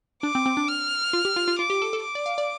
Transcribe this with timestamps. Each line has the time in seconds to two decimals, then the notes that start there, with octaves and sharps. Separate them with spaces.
0.23 D4 D6
0.35 C4
0.46 C4
0.57 D4
0.68 F6
1.13 F4
1.25 G4
1.36 F4
1.48 F4
1.59 F4 D6
1.70 G4
1.82 A4
1.93 A4
2.04 D6
2.15 D5
2.26 F5
2.38 D5